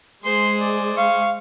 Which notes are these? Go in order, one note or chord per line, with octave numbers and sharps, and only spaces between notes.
G#3 G#4 C5 C6
D5
F5 C#6